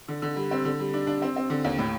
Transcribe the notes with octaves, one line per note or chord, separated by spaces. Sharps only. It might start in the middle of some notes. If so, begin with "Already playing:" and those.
D3
D3
G3
C4
D3
G3
D4
D4
C4
C4
D3
D#2
A2